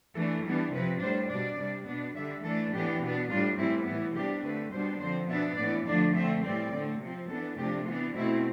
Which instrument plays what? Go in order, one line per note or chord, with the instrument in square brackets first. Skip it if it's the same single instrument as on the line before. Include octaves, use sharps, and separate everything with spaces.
[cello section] E3 A3 D4 A4
E3 G3 B3 D4 E4
C3 F3 C4 B4
A2 G3 D4 C5
B2 G3 D4 D5
C3 G3 D4
B2 B3 D4
D3 G3 D4 E5
E3 A3 D4 A4
A2 E3 B3 D4 G4
B2 B3 D4
A2 G3 D4 F4
A2 E3 G3 C4 E4
A2 E3 B3 E4
C3 G3 B3 D4 G4
D3 A3 C4 B4
B2 G3 B3 D4 C5
D3 F3 C4 C5
B2 B3 D4 E5
A2 E3 B3 D5
D3 F3 A3 D4 D5
D3 A3 C4 E5
A2 E3 G3 C4 D5
D3 A3 C4
C3 F3 C4
E3 B3 D4 A4
C3 F3 A3 D4 G4
E3 B3 D4 F4
B2 A3 C4 E4